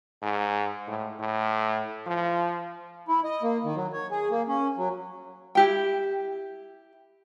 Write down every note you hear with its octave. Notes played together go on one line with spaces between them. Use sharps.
G#2
A2
A2
F3
E4
D#5
A#3
D#3
F#3
C#5
G#4
A#3
C#4
F#3
E4 G4 G5